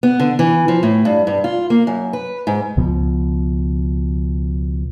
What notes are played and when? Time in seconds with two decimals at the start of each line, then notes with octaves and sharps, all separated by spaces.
0.03 B3
0.20 D3
0.39 E3
0.68 F3
0.83 A2
1.05 G2
1.27 G2
1.44 F4
1.70 A#3
1.87 F#2
2.13 B4
2.47 G#2
2.77 C#2 B2 F3